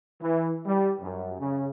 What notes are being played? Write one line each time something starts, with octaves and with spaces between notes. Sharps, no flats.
E3
G3
F#2
C#3